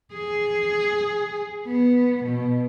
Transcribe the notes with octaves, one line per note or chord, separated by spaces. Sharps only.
G#4
B3
B2